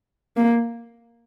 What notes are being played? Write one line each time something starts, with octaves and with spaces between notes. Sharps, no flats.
A#3